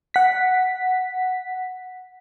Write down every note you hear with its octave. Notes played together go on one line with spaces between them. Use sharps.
F#5 B6